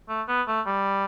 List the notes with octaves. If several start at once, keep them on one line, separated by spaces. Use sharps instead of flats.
A3
B3
A3
G3